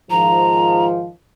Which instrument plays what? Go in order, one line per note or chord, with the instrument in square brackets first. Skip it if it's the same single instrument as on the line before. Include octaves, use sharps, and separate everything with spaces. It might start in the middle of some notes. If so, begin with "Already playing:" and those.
[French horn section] G#2 D#3 F3 [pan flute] A#5